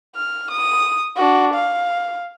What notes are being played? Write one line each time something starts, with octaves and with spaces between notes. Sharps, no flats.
F6
D#6
D4 F#4
F5